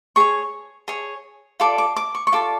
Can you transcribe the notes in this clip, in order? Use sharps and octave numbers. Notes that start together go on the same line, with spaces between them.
G#4 C#5 C#6
G#4 C#5
F4 A4 D5 D6
D6
D6
C#6
C#6
F4 A4 D5 D6